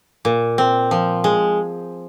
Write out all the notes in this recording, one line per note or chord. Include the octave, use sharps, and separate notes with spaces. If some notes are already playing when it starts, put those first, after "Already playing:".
A#2
C4
F3
G#3